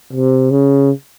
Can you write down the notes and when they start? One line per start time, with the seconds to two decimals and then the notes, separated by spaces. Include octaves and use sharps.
0.13 C3
0.51 C#3